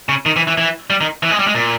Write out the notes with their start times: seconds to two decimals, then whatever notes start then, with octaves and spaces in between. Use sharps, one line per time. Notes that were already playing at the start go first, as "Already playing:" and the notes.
0.09 C#3
0.26 D#3
0.36 E3
0.47 E3
0.58 E3
0.90 G3
1.01 D#3
1.23 E3
1.31 G#3
1.39 G3
1.47 G#3
1.55 A#2